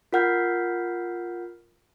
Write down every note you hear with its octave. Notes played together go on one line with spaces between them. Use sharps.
F4 A#4 F#5 F6 G6 B6